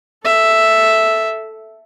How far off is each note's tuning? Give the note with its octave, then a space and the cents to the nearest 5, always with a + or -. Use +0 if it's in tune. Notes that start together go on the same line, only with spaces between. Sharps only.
A4 +0 E5 +0